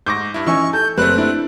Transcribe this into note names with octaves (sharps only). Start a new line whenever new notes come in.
G#2 C#6 D6 G6 A#6
G2 E4
E3 C#4 D#4 G#5 C#6 E6
A4 G6
F#1 A3 C4 B4 F#6
D4 E4